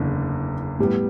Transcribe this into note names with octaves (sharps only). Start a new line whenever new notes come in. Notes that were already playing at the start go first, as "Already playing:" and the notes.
Already playing: F#1 E2 D3
A2 G3 B3